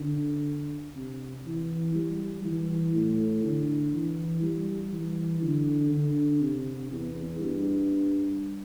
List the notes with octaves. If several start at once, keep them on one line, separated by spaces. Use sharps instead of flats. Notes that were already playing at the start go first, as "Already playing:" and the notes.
Already playing: D3
C3
E3
G3
E3
A2
D3
E3
G3
E3
D3
D3
C3
E2
G2